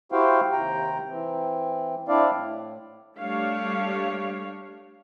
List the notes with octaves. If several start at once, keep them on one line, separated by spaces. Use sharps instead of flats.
E4 F#4 G4 C5 F5 G5
D#2 C3 G5 A#5
E3 C4
C4 D4 E4 D5 F5
A2
G3 A3 D4 G4 C#5 F5